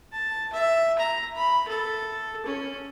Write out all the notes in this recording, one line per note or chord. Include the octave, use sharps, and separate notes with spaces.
A5
E5
A#5
B5
A4
C#4